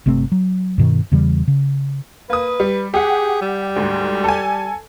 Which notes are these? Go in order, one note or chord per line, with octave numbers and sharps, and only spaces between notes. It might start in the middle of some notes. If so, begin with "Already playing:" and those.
G1 C3 A3 C4
F#3
G2 B2 D#3
E2 C#3 E3 G3
C#3
A#3 B4 D#6
G3
G4 G#4 F#5
G3
D2 G#2
A4 G#5